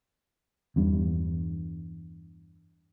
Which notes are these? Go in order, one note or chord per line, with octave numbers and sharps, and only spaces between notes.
E2 G2